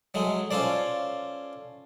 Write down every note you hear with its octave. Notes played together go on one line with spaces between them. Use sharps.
F#3 G#3 A3
C#4 F4 A4 C5 D5